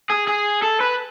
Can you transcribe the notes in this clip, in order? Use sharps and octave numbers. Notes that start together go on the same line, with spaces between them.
G#4
G#4
A4
B4